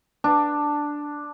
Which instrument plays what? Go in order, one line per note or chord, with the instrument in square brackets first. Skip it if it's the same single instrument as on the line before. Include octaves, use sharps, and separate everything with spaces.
[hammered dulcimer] D4